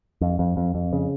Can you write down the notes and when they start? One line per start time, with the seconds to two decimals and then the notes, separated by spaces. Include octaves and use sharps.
0.21 F2
0.39 F2
0.57 F2
0.75 F2
0.93 C#3